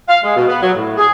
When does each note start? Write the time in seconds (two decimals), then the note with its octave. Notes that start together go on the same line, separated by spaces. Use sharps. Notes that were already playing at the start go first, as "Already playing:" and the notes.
0.08 F5
0.24 G#3
0.36 B2
0.48 B3
0.62 F#3
0.75 A2
0.97 G#4